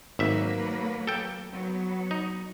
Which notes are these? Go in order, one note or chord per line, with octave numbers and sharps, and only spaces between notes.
G#1 F#3 A#3 B4 E5
A4 G5
F#3 B3
D#4